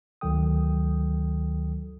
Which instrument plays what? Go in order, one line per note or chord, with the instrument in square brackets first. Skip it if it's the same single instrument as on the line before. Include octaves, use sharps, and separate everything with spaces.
[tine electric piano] D2 D#3 F#3 A4 G5 D#6